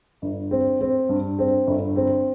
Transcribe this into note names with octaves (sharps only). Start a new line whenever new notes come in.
G1
C4
C4
G2
C4
G1
C4